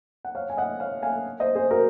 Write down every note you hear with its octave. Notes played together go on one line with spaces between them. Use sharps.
F#5
C#5 F5
G#5
D#5 F#5
C#5 F5
F5 G#5
C5 D#5
G#4 C5
F#4 A#4